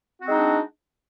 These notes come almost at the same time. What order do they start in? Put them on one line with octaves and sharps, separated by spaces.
F#4 C4 G#3 D#4 D4